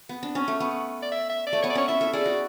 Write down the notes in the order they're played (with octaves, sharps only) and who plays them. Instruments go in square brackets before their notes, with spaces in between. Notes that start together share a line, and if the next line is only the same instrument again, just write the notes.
[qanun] B3
D4
C#4
A3
B3
[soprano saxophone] D5
E5
E5
D5
[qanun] A3
[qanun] B3 [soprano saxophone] C#5
[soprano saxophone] D5
[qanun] C#4 [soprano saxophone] C#5
[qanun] E4 [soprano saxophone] E5
[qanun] A4
[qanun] G#4 [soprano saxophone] D5
[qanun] F#4